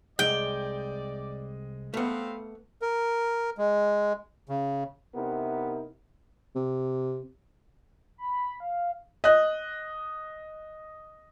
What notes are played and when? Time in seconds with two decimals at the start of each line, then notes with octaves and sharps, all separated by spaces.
0.19 C2 G#3 D5 D#5 G5
1.94 A3 B3 C4 B4 F5
2.82 A#4
3.58 G#3
4.49 C#3
5.15 C3 B3 D#4 E4 A#4
6.55 C3
8.18 B5
8.60 F5
9.24 D#5 F#6